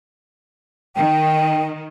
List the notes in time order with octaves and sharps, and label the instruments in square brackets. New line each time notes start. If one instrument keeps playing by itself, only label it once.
[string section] D#3 [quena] G5